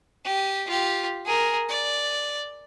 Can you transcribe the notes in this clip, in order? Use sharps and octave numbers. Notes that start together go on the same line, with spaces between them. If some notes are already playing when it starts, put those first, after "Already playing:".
G4
F4 G4
G#4 A#4
D5